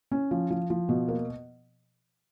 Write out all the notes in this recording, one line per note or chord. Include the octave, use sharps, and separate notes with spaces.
C#4
F3
F3
F3
B2
A#3